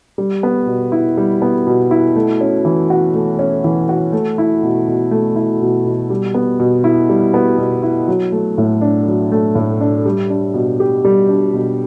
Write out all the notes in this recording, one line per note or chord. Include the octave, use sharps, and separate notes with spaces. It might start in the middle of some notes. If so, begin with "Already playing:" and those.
G3
B3
B2
E4
G3
B3
B2
E4
A3
C#4
E3
F#4
A3
C#4
E3
F#4
A3
E4
B2
B2
A3
E4
B2
B2
G3
B3
B2
E4
G3
B3
B2
E4
F#3
A3
A2
D4
F#3
A3
A2
D4
G3
D4
B2
G4
G3
D4
B2